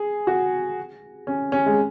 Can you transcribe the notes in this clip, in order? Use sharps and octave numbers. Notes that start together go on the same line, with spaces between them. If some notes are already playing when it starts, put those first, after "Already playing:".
Already playing: G#4
F#4
C#4
C#4
G#3